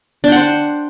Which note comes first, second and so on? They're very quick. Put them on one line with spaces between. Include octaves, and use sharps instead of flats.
D4 G5 F#5 C5